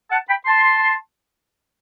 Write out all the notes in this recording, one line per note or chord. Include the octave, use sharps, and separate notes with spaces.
F#5 A5
G5 B5
A5 C6